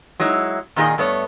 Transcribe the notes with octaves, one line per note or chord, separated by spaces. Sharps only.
F#3 G#3 D#4 E4
A#2 D#3 D#4 G#4 D#5 G#5
G2 A3 B3 C#5